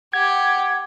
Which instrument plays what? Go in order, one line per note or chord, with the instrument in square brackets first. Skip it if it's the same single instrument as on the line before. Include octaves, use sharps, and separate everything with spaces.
[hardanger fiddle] G4 [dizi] F#5 [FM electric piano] G#6